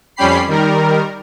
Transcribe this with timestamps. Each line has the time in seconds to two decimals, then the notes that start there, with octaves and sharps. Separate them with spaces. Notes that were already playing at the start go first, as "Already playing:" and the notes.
0.16 F2 G3 C#4 G4 B5 C7
0.48 D#3 G3 A#4